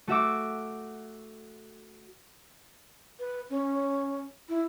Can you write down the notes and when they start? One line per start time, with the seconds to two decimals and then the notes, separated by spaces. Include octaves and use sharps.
0.07 A3 F#4 E5 D6
3.20 B4
3.50 C#4
4.49 E4